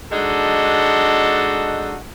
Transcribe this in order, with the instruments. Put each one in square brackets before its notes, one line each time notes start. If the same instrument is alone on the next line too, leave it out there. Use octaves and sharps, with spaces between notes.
[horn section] G#3 D4 D#4 F#4 A4